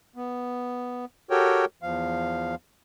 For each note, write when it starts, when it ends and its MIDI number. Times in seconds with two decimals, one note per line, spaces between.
0.16 1.05 59
1.30 1.65 66
1.30 1.65 67
1.30 1.65 69
1.30 1.65 70
1.30 1.65 73
1.30 1.65 79
1.82 2.55 40
1.82 2.55 53
1.82 2.55 77